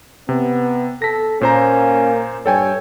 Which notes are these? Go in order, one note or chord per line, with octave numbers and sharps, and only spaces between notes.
C3 B3
A4 A#6 B6
A#2 A#3 C#4 C5 A#5
G2 A4 C#5 G5 G#5